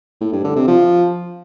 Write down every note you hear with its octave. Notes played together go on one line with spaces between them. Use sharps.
A2
G2
D3
C3
F3